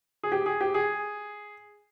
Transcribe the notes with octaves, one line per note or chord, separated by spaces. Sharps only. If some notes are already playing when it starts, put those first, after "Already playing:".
G#4
G4
G#4
G4
G#4